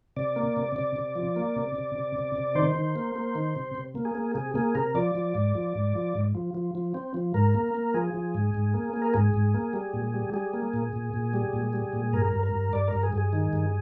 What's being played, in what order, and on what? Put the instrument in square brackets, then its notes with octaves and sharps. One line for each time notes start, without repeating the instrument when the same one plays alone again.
[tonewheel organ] C3 D5
A#3
C3
C3 D5
C3
F3
A#3
C3
C3
C3
C3
C3
D#3 C5
D#3
A#3
A#3
D#3
C3
C3
A#3
G#4
A#3
C3 G#4
A#3 G#4
C3 A#4
F3 D5
F3
G#2
F3
G#2
F3
G#2
F3
F3
F3
C4
F3
G#2 A#4
A#3
A#3
F3 G#4
F3
G#2
G#2
A#3
A#3
A#4
G#2 G#4
G#2
A#3
G3
A#2
G3
G3 G#4
A#3
A#2
A#2
A#2
G3
A#2
G3
A#2
G2 A#4
G2
A#4
G2
G2 D5
G2 A#4
G#4
G2
G#4
D#3
G2